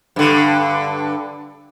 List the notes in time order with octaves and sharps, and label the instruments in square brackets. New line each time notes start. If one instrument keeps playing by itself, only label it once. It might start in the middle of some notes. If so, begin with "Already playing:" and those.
[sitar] G2 D3